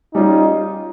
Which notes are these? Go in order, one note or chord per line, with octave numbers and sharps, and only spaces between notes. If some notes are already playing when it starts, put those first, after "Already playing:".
G3 C#4 D#4 F4